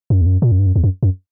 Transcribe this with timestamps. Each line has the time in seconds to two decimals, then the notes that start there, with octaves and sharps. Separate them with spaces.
0.10 F#2
0.21 E2
0.26 F#2
0.42 A#2
0.52 F#2
0.59 G2
0.66 F#2
0.76 E2
0.84 F#2
1.03 F#2